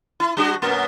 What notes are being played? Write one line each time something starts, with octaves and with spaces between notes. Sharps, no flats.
E4
G3 D4 F#4
F#2 B2 A3